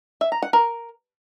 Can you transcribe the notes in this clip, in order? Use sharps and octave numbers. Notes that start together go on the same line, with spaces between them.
E5
A#5
F#5
A#4